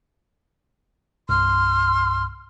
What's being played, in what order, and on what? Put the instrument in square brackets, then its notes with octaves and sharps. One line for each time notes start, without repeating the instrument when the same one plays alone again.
[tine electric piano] C2 G2 [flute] C6 [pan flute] F6